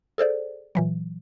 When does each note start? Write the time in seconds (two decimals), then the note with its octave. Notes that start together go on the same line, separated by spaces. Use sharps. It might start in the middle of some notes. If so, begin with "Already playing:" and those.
0.18 G#4 A4 C5 D5
0.75 A#2 E3 F#3